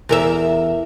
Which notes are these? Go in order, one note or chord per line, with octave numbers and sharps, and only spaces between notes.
E2 A#4 E5